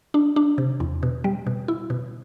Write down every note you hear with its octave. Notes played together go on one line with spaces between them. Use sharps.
D4
D4
C3
E2
B2
G3
B2
E4
B2